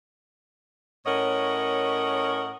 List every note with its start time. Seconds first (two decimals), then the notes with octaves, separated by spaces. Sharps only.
1.06 A2 C#4 A#4 C#5 D#5 F#5